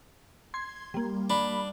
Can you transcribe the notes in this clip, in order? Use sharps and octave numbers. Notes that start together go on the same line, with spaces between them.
C6 G#6
G3 A#3
D4 B5